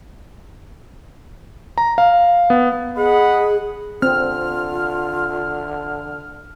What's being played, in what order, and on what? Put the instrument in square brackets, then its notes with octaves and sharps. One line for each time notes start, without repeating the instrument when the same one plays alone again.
[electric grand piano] A#5
F5
B3
[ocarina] G#4 [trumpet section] D#5 F#5 B5
[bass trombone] D3 [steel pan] C4 [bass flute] F4 [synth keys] F6